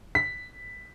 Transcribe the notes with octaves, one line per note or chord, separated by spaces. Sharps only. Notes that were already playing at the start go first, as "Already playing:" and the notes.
B6